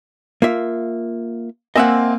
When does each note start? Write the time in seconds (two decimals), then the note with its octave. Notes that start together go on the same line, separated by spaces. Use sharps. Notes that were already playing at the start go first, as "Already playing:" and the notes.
0.42 A#3 F4 E5
1.76 A#3 C4 D#5 E5 F#5 G#5